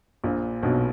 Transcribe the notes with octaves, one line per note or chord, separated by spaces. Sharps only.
A#1 A#2
B1 B2